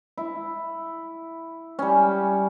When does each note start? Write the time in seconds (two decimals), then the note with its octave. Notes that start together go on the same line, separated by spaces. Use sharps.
0.18 E4
1.79 G3 C#4